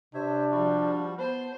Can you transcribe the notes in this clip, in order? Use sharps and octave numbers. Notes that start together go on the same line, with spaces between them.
C3 D4 C5 C#5 E5
F3 G3 F#4
B3 C5 A5